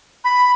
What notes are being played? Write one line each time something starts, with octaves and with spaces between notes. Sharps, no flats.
B5